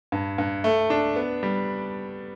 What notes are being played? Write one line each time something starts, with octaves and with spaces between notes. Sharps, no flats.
G2
G2
A3
D4
B3
G3